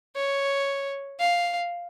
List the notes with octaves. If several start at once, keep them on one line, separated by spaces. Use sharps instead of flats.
C#5
F5